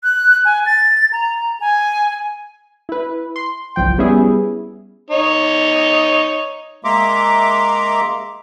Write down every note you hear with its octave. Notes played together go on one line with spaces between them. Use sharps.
F#6
G#5
A6
A#5
G#5
E4 B4
C6
G1 C2 F3 G5
G3 B3 C#4 E4 G#4
D#4 C#5
G#3 A#3 E5 A#5 C6 D6